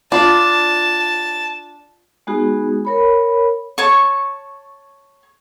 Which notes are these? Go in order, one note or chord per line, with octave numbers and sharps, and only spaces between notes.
D4 F4 D5 A5
G#3 B3 D#4 F#4 G#4
A#4 C#5 B5
C#5 A5 C#6